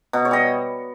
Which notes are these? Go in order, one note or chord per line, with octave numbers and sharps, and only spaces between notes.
B2
C#5
G3 D#5